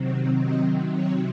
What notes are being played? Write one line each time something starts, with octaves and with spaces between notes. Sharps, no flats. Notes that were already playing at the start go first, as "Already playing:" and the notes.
Already playing: C3 D#3 F#3 C4
D#5
C#5